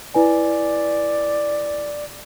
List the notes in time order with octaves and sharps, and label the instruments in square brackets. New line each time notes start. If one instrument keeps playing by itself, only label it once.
[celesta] E4 B4 G#5 [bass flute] D5